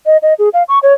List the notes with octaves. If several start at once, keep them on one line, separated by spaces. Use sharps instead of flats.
D#5
D#5
G#4
F5
C#6
C#5